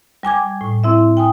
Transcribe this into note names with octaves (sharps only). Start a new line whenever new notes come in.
G3 G#5 D6 G#6
A2
C4 E4 E5
G5 G#5 D#6